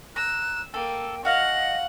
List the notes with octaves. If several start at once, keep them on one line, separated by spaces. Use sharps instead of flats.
A#5 E6 F#6
A#3 A4 G5
F#4 D#5 F5 F#5 G#5